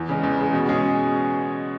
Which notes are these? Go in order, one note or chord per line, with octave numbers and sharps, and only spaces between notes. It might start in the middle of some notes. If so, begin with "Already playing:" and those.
Already playing: E2
C#3 G#3
E2
C#3 G#3
B2
G#3 C#4 G#4